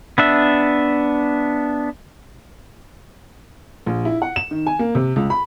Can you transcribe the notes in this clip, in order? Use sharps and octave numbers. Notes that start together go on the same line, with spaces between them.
B3 D4 E5
A#1
E4
F#5
E7
D#3
G#5
A#3
C3
C#2
B5